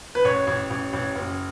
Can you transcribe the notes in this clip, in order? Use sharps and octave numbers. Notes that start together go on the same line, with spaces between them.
B4
A1 C#5
A1
A1
A1
F#1